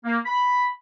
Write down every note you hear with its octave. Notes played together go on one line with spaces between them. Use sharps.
A#3
B5